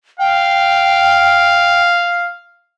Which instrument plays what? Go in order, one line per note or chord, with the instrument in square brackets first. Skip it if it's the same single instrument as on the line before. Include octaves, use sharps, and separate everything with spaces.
[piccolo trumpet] F5 [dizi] G5